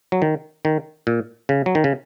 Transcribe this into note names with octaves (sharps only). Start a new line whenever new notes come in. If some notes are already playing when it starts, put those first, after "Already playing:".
F#3
D#3
D#3
A#2
C#3
F#3
D#3
C#3